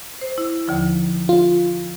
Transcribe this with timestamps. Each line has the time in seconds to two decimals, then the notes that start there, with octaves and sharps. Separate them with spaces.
0.21 C5
0.38 E4
0.68 D#2 D3 F3
1.29 F4